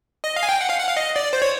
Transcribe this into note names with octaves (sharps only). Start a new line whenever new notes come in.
D#5
F5
G#5
G5
F#5
F5
F#5
F5
D#5
D5
C5
C#5